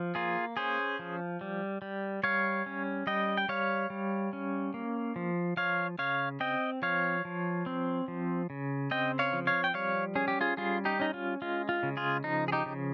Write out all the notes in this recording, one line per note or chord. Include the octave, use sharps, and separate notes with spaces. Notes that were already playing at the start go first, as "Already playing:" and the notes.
Already playing: F3
A#3 F4 G#4
C#4 G#4 C5
F3
G3
G3
G3 C#5 F5
C#4
G3 D#5 G5
G5
G3 C#5 F5
G3
C#4
A#3
F3
F3 C#5 F5
C#3 C#5 F5
C4 D#5 G5
F3 C#5 F5
F3
C4
F3
C#3
C4 D#5 G5
C#5 F5
F3
C#5 F5
G5
G3 C#5 F5
C#4 G#4
G4
F4 G#4
G3 F4 G#4
D#4 G4
C#4 D#4
F4
G#3 F4
F4
C#3
F4 G#4
F3 D#4
G#4
D#4 G4
C#3